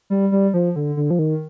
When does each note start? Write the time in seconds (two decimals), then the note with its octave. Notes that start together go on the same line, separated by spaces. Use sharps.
0.10 G3
0.32 G3
0.54 F3
0.76 D3
0.97 D3
1.10 F3
1.19 D#3